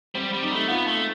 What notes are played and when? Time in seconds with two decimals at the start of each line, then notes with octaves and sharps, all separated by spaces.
0.15 G3 C4
0.33 G3
0.42 D#4
0.51 A3
0.69 B3 F4
0.88 A3